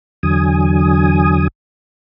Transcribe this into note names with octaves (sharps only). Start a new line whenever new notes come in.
E2 D3 F#3 G#5 D#6